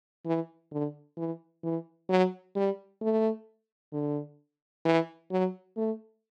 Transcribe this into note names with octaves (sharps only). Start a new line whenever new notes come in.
E3
D3
E3
E3
F#3
G3
A3
D3
E3
F#3
A3